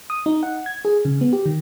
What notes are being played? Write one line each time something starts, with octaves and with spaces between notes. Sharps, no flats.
D#6
D#4
F#5
G#6
G#4
C#3
B3
G4
D#3